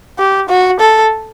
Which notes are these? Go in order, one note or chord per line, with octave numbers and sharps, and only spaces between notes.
G4
F#4
A4